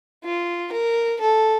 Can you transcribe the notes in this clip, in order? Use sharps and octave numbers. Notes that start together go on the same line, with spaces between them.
F4
A#4
A4